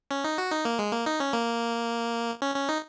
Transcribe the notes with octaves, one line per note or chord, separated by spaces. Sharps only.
C#4
D#4
F#4
D#4
A#3
G#3
A#3
D#4
C#4
A#3
C#4
C#4
D#4